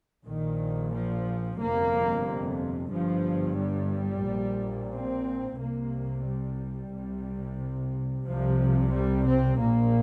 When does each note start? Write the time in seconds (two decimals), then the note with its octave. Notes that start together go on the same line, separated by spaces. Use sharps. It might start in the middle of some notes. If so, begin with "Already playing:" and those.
0.25 A#1 A#2 D#3
0.92 F3
1.58 G1 F2 C3 A#3
2.92 G1 G2 F3
3.58 G3
4.25 A#1 A#2
4.92 C4
5.59 C2 C3 A#3
6.26 G3
6.92 C2 C3
8.25 C2 C3 F3
8.92 G3
9.25 C4
9.58 A#1 A#2 A#3